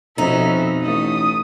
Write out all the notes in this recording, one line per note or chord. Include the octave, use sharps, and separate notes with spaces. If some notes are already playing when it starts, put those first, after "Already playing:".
F2 B2 B3 C#4 D#4 E5
A1 A3 D#6